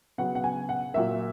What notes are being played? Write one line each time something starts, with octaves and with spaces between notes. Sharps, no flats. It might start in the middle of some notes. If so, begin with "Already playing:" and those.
C#3 F#3 B3 F#5
F#5
G#5
F#5
A#2 F#3 A#3 E5